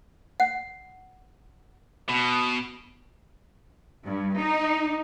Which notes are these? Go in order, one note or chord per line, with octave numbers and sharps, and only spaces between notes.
F#5
B2
G2
D#4